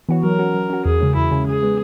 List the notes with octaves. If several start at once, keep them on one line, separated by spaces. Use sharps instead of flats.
E3 B3 F#4 C#5
F#3 A#4
C#4 F#4
F#3
C#4 F#4
E2 G#4
C#3 G#3 C#4
E2 E4
C#3 G#3 C#4
C#3 G#4
G#3 B3